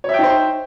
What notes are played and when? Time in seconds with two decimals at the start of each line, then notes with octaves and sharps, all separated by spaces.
0.04 C#5
0.09 E5
0.14 G5
0.19 D#4
0.24 C5